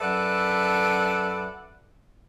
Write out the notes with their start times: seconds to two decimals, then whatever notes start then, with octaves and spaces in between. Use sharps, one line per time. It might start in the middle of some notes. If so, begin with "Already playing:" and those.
0.01 F#2 A4 B4 D5 E5 F#5